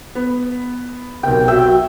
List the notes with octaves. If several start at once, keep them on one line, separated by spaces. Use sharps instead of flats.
B3
B1 C3 A#4 G5
F#4 E5 G5